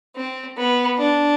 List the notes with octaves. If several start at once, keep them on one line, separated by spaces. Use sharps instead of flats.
C4
B3
D4